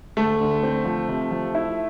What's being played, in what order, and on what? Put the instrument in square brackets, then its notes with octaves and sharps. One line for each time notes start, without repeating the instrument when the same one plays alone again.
[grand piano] D2 [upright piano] A3
[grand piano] D3
C4
F3
C3
F3
E4